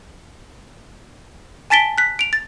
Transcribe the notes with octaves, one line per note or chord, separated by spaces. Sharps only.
G#5 A5 A6 B6 D7 G7
F#6 B6
D7 F7
A6